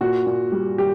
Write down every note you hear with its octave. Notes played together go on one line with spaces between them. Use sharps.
A#2 F#4
A#2
G3
G3 G4